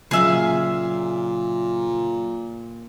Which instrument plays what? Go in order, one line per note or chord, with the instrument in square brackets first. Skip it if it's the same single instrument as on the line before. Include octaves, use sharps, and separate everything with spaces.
[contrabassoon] A#2 [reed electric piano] C#3 F#3 [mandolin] G#4 E5 F5